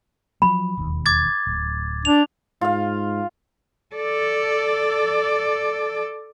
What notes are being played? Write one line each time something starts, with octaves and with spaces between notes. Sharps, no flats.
F3 F#3 A3 B5
E1 D#2
D6 G#6 A6
D1
D4 F7
G#2 F4 F5
A4 D5